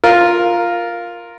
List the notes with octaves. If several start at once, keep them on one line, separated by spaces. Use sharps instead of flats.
F4 A#4